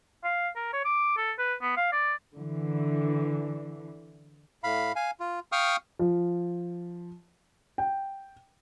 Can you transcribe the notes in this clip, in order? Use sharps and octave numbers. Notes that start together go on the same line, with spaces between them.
F5
A#4
C#5
D6
A4
B4
B3
F5
D5
D3 E3
A2 F5 B5
F5 G#5
F4
F5 G5 C#6 D#6 F6
F3
G5